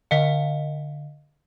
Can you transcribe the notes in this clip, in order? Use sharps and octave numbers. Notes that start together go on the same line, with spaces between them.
D3 D#5 F5